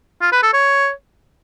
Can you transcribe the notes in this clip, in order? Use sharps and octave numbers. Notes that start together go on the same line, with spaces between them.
F4
B4
A4
C#5